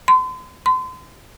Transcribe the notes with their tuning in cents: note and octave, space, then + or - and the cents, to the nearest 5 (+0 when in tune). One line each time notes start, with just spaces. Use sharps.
C6 -40
C6 -35